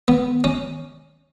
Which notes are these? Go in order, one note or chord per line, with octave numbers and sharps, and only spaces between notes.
B3
C#4